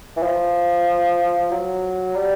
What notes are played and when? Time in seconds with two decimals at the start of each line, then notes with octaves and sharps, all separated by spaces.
0.17 E3
0.23 F3
1.52 F#3
2.16 G3